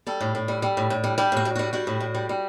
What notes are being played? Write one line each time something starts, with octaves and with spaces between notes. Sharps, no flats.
G3 A4
A2
A2
G3
G3
A2
A2
G3
G3 G4
A2
F#4
A2
G3 F#4
G3 F#4
A2
A2
G3
G3